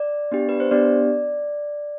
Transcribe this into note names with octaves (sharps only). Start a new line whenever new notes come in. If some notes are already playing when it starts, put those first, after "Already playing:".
Already playing: D5
B3 D4 G4
B4
C5
B3 D4 G4 D5